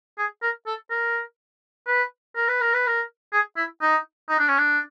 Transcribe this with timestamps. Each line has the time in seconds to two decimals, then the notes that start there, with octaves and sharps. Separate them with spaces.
0.18 G#4
0.42 A#4
0.67 A4
0.90 A#4
1.87 B4
2.36 A#4
2.48 B4
2.61 A#4
2.74 B4
2.87 A#4
3.33 G#4
3.57 E4
3.82 D#4
4.29 D#4
4.39 D4
4.48 C#4
4.58 D4